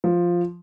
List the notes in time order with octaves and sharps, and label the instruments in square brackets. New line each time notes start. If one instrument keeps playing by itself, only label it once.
[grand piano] F3